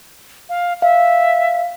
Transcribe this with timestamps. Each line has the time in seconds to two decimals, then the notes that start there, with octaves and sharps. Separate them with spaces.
0.49 F5
0.82 E5 F5